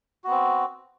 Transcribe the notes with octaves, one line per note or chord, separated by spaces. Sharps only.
B3 C4 F#4